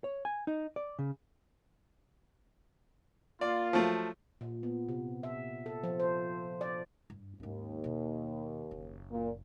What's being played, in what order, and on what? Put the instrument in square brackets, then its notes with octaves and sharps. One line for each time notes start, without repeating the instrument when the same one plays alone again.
[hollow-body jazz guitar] C#5
G#5
D#4
D5
C#3
[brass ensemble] A#3 F4 [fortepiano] D5
[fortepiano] F3 F#3 A3
[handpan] A#2
B3
C3
E5
A4
F3
C5
D5
[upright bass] G2
[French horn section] D#2 [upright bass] G#2 C#4
[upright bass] B2 D#3
F#1 C#3
[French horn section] A#2